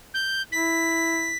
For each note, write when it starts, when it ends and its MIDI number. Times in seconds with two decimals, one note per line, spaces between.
0.14 0.42 91
0.52 1.34 64
0.52 1.38 95